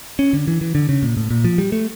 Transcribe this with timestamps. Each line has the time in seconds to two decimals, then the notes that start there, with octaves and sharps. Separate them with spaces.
0.19 C#4
0.33 D3
0.47 E3
0.61 E3
0.75 D3
0.89 C#3
1.03 A#2
1.17 A2
1.31 A#2
1.44 F3
1.58 G3
1.72 A3